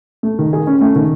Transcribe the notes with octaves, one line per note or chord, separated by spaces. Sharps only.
A3
D#3
G#4
C#4
A3
D#3